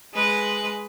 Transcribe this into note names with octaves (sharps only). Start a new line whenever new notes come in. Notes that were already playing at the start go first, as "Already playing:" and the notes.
G#3 B4